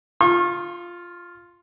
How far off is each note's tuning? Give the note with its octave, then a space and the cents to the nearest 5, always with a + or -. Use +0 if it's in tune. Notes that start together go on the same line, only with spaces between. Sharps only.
F4 +0 C#6 -45